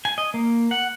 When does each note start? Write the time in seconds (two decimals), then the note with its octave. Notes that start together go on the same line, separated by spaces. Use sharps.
0.05 G#5
0.18 D#5
0.34 A#3
0.71 F#5